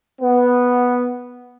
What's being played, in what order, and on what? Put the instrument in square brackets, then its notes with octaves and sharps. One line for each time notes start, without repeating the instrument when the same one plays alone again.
[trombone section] B3